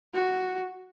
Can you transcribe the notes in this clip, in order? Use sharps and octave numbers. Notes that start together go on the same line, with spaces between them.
F#4